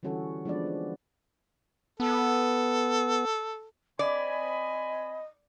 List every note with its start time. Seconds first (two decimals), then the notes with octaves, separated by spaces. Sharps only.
0.03 D3 E3 G3 C#4 F#4 A4
0.45 F3 G#3 B3 D4 B4 D5
0.66 D4
2.00 B3 A4
3.99 C4 D5 D#5 G#5 B5